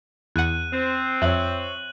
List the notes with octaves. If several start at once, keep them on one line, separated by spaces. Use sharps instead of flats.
E2 F#5 F#6 D#7
C4
F2 C#5 E5 F#6 F#7